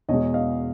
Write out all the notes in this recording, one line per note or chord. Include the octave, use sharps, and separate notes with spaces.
E2 B2 G#3 C#5 D#5
D#5 F5